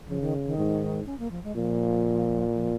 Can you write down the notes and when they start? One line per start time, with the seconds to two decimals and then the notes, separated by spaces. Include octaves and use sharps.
0.08 C#3 F3
0.21 D#3
0.45 D#3
0.58 G#2
1.06 C#4
1.19 A#3
1.31 F3
1.44 G#3
1.56 A#2 F3
2.54 F3